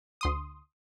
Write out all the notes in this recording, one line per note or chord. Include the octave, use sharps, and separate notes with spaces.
D2 C6 D#6